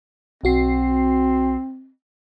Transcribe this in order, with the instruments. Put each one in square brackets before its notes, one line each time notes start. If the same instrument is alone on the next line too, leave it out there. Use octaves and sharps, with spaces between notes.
[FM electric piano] B1 F#4 C7 [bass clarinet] C4